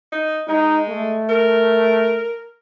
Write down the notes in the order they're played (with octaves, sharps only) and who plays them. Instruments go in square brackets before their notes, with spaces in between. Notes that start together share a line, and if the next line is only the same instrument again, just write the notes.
[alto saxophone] D#4
[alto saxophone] G#3 [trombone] D#4
[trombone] A3
[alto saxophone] A#4